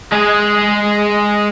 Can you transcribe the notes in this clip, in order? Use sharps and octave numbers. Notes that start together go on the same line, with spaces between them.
G#3 G#4